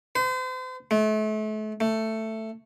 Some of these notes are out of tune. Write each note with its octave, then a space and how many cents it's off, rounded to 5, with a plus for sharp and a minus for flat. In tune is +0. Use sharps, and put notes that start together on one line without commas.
C5 -40
A3 -35
A3 +10